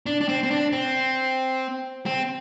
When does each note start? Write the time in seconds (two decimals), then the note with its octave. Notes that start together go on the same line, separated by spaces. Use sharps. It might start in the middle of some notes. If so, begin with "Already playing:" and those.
0.06 D4
0.21 D4
0.28 C4
0.43 C4
0.51 D4
0.73 C4
2.06 C4